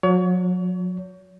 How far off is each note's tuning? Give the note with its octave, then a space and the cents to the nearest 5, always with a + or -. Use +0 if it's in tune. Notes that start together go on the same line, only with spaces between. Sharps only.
F#3 -35 C#5 +35